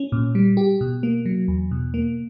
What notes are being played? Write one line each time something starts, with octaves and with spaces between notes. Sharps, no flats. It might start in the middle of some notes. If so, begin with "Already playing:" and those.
Already playing: C#4
A#2
G3
G4
B2
A#3
F#3
E2
B2
A#3